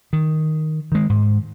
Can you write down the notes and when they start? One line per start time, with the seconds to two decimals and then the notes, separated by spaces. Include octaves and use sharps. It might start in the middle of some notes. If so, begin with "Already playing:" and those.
0.13 D#3
0.92 D#3 G#3
1.10 G#2